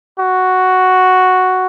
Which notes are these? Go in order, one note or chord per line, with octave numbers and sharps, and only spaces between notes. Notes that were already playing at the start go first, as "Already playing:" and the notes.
F#4